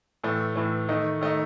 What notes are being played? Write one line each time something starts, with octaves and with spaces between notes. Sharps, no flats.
A2 E3 A3
A2 E3 A3
D#3 A3 D#4
D#3 A3 D#4